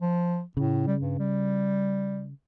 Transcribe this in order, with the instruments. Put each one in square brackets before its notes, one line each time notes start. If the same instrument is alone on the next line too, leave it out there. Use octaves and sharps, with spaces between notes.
[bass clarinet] F3
[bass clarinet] A2 [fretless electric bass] C#3
[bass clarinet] G3
G2
G3